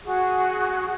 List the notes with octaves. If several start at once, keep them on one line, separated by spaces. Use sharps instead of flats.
F#4 G#4